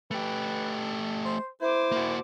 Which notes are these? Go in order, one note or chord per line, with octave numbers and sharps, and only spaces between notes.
A3 G4 B4
C5
E4 C5 D6
A#3 F#4